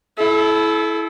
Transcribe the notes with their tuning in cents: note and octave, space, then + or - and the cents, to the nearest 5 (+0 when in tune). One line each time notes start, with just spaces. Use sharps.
E4 +0 A4 -35